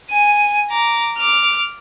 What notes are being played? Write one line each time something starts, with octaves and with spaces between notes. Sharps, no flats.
G#5 D#7
A#5 D6
D6 F6